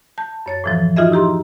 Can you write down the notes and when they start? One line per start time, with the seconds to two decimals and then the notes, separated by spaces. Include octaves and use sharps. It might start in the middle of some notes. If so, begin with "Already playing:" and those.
0.18 A5 G6
0.46 F#2 C#5 A6
0.64 A2 E3 F3
0.96 D#4 F4 F#4 G#4 D#5 E5
1.12 E4 G4 A#5 C6